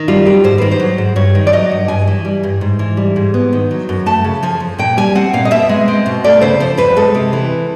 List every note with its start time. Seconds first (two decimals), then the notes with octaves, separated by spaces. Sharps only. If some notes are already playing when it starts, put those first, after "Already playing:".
Already playing: D#3
0.08 G3 F4
0.25 F#2 G4
0.44 G#2 C5
0.58 D#3 B4
0.71 C5
0.80 F#3
0.98 G#2
1.16 G2 C#5
1.35 D#3
1.47 D5
1.53 F#3 D#5
1.71 G2
1.88 G2 G#5
2.07 E3
2.25 G3
2.43 G2
2.61 G#2
2.79 E3
2.97 G3
3.16 G#2
3.34 B3
3.53 D#3
3.71 F#3
3.89 F#2
4.06 A3 A5
4.24 C#3
4.43 F3 G#5
4.60 F2
4.78 A#2 G5
4.97 G3 G#5
5.15 C4 F#5
5.33 A#2 F5
5.45 D#5
5.51 B2 E5
5.69 G#3
5.88 C4
6.06 B2
6.24 A3 D5
6.41 C#3 C5
6.60 F3 C5
6.77 E2 B4
6.97 G#3 A4
7.15 C3
7.33 E3